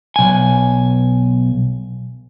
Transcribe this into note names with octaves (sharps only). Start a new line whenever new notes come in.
B1 G#5